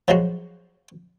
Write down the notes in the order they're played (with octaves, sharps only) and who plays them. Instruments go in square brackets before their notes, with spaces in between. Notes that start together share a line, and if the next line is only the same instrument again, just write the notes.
[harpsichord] F3 F#3 G#3 F#4